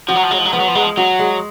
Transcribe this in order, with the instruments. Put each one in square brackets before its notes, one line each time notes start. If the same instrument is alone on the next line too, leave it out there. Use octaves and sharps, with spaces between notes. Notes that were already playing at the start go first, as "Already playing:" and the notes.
[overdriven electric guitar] F3 [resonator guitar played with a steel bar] F#4
[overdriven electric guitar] F#3
F3
[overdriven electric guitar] F#3 [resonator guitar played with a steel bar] G#3
[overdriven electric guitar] F3
F#3
[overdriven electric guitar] F3 [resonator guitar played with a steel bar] B3
[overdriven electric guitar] F#3
F3
[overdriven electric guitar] F#3 [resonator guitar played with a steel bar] G#3
[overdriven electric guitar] F3
[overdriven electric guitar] F#3 [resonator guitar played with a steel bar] F#4
[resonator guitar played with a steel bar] G#3